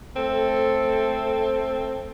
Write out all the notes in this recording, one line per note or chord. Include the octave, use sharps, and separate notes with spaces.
A3 C4 A4